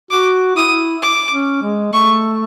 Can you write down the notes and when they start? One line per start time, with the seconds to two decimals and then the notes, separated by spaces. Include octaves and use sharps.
0.11 F#4 D6
0.56 E4 D#6
1.02 D6
1.32 C#4
1.62 G#3
1.93 A3 C#6